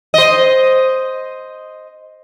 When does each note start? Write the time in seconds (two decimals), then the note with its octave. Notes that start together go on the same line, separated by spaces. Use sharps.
0.14 C5 D#5